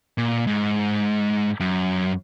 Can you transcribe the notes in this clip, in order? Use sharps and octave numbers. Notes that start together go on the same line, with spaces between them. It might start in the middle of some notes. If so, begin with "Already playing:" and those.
A#2
G#2
F#2